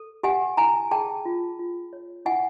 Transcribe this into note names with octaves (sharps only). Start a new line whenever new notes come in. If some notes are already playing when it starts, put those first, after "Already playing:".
Already playing: A4
G4 F#5 G#5
E4 G#5 A#5
G#4 G5 A5
F4
F4
C#5
E4 F#5 G#5